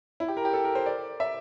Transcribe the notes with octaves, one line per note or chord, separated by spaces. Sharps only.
E4
G4
A#4
G4
A4
A#4
C5
D5
E5